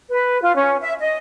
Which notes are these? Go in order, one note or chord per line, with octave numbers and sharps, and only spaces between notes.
B4
F4
C#4
E5
D#5